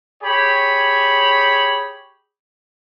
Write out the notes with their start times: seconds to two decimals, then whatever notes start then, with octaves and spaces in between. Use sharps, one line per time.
0.22 G4 G#4 C#5 B5